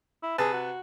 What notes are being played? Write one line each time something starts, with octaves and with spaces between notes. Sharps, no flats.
E4
C3 G#4 B4 A5
F#4